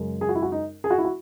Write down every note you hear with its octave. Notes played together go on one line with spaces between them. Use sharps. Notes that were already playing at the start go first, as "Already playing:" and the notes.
Already playing: F#2 C#3 G#3
G#4
F#4
E4
F#4
D#4
G#4
F#4
E4
F#4